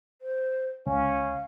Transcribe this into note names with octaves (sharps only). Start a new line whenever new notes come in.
C5
C#2 C#4 F5